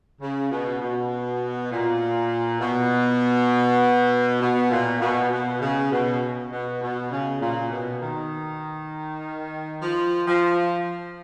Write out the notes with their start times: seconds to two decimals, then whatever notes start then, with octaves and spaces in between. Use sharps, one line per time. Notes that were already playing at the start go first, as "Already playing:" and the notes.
0.20 C#3
0.50 B2
0.80 B2
1.70 A#2
2.60 B2
4.41 B2
4.71 A#2
5.01 B2
5.31 B2
5.60 C#3
5.91 B2
6.51 B2
6.81 B2
7.11 C#3
7.41 A#2
7.71 B2
8.01 D#3
9.81 F3
10.27 F3